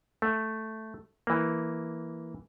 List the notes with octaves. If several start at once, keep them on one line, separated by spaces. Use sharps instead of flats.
A3
E3 A#3